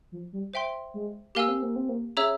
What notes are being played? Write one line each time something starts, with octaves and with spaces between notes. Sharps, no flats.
F3
G3
C5 E5 G5 C6
G#3
A#3 G4 A#4 F5 G#5 E6
C4
A#3
C4
A#3
C#4 G#4 C#5 E5 A#5 E6